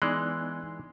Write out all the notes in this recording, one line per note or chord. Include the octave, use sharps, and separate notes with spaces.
E3 G#3 B3 D#4 D5 C6 F#6